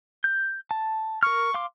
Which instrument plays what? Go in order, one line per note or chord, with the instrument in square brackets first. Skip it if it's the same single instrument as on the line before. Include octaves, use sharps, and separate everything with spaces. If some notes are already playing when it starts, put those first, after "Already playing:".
[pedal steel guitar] G6
A5
[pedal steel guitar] A#4 F6 [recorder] C#6
[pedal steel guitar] F5 C6 D6